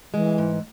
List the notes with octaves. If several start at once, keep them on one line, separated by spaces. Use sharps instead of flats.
E3 G#3
G#2